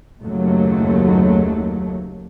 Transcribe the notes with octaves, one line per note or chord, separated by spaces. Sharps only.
F#1 D#2 F#3 A3